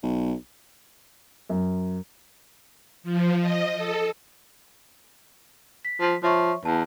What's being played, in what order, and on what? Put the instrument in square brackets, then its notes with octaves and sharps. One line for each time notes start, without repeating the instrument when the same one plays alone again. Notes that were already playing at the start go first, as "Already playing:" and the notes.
[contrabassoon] B1
[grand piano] F#2
[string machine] F3
D#5
A4
[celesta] B6
[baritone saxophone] F3
[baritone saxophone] F3 [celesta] C#5 E5 C#6
[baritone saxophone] E2 [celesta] A5